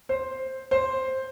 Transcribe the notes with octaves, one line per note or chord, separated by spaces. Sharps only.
C5
C5